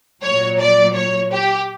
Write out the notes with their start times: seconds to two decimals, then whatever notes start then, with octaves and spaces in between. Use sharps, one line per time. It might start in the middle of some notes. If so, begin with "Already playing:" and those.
0.24 A#2 F#3 C#5
0.60 D5
0.95 C#5
1.32 G4